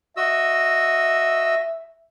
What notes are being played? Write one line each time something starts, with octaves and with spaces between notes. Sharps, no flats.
F#4 D#5 E5 E6